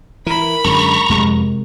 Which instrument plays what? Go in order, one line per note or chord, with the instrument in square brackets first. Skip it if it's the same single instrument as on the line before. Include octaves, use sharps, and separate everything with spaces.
[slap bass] E3 [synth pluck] A#4 [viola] B5
[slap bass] F#2 D3 G#3 [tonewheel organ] A#5 C#6
[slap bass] F2 [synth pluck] C3 G#3